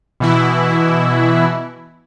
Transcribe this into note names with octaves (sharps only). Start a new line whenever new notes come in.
B2 E3 E4